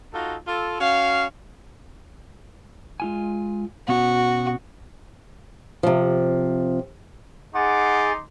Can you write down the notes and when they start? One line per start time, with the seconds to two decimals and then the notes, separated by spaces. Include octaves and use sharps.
0.13 D#4 F4 F#4 A4
0.46 F4 A4
0.79 C#4 F#4 F5
3.00 G#3 F4 G#5
3.88 B2 B3 C#4 F#4
5.83 C3 F3
7.55 D#4 G#4 F#5 G#5 C6 D6 A6